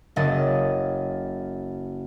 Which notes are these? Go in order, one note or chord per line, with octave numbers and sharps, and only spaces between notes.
F#1 D#5 A6